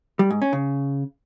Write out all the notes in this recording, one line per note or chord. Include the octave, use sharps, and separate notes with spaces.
G3
G#2
C#4
C#3